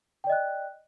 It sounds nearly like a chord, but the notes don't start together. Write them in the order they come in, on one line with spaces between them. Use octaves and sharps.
G5 D5 D#5 F#6